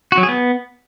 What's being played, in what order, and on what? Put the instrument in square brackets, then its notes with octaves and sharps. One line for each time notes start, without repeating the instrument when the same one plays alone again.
[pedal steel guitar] F#4
F#3
G#4
B3